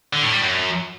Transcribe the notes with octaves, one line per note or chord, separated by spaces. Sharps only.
D3
A2
G3
F#2